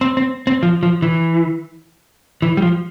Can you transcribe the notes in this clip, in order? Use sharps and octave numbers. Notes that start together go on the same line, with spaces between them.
C4
C4
C4
F3
F3
E3
E3
G3
F3